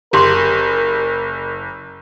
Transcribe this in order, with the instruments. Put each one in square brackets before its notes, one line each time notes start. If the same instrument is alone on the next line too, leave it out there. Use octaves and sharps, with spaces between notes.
[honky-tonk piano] F#1 [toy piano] G4 C6 D6 [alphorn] A#4